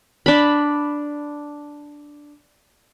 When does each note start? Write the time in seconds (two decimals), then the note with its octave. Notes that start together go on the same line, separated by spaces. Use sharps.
0.26 D4 B5